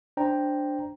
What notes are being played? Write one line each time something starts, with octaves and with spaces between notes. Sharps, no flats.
D4 C5 D5 G5 A#5